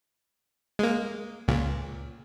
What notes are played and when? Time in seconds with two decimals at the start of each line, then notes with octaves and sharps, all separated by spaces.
0.79 G#3 A#3
1.48 C#2 A#2